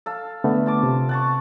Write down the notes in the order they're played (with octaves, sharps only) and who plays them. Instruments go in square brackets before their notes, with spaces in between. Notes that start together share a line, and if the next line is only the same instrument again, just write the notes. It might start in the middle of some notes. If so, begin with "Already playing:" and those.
[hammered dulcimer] A4 F5
[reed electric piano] D3 A3 B3
[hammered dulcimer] F4 A5 D6
[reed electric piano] C3
[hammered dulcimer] F#5 A5 C#6